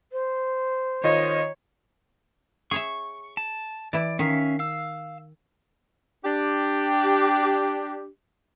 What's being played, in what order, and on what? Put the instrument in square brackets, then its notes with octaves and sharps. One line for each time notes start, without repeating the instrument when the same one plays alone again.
[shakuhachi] C5
[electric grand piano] D#3 F4 D#5 [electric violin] C#5
[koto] G#4 C#5 E5 [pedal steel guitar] C#6
[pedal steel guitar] A5
[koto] E3 E4 [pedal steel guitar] D5
[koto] D#3 [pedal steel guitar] C#4 E5 F5
[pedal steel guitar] F5 E6
[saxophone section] D4 G4